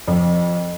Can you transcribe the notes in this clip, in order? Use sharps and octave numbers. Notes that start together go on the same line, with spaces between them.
F2